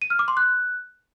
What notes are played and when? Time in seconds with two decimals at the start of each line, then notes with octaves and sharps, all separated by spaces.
0.02 D#7
0.10 F6
0.19 D6
0.28 C6
0.37 F#6